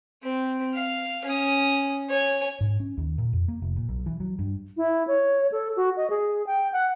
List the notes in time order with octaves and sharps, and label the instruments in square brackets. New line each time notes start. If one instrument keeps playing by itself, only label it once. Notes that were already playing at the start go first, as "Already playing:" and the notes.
[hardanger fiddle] C4
F5
C#4 D#6
C#5 G#5
[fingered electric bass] G#2
C#4
D#2
A#2
F2
A#3
F1
A#2
B1
E3
F#3
G2
[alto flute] E4
C#5
A4
F#4
D#5
G#4
G5
F#5